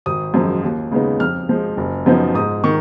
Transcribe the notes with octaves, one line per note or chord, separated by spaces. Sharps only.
G#1 D#6
F#2 F3 G#3
D#2
C#3 G#3 B3 D#4
F2 F6
F3 G#3
F#1
F#2 F3 B3 D#4
G#2 D#6
D#3 C#6